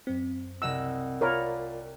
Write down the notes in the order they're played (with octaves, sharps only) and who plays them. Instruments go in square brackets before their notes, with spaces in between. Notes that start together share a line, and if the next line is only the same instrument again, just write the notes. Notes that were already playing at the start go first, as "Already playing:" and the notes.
[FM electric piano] F#2 C4
[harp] C2 D#5 F#5 [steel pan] E6
[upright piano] F4 D5 B5 [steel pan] A#4 C#5